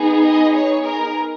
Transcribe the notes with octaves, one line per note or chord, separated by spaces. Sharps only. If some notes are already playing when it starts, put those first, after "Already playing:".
Already playing: B3 D#4 G#4
D#5
C#5
A#4